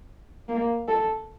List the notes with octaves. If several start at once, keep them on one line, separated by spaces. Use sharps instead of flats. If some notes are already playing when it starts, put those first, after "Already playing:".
A#3
A4